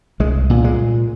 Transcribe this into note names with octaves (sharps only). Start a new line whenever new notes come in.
C2 G#3
A#2
G#3